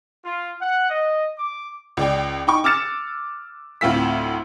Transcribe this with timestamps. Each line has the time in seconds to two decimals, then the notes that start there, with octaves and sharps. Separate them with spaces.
0.25 F4
0.60 F#5
0.89 D#5
1.38 D6
1.97 C#2 D5 G5
2.47 D#4 G5 C#6
2.64 D6 E6 F6 A6 C#7 E7
3.81 D2 A2 C4 F4 E6 B6